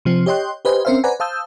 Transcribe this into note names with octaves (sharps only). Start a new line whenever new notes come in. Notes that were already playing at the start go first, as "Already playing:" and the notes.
C3 F3 C4
G4 C#5 D#5 G5 C6 F#6
G4 B4 C5 D#5 G#5
C4 C#4 A#4 C5 E5 F5
B4 C5 D5 F#5 G#5 A#5
C5 F5 A5 D#6 E6 G6